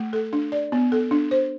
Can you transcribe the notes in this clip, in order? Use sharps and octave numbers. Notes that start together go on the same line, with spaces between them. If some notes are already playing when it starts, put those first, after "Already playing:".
Already playing: A3
A4
D4
D5
B3
A4
D4
C5